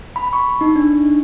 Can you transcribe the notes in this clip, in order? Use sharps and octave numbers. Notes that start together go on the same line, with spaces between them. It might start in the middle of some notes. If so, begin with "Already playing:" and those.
B5
C#6
D#4
D4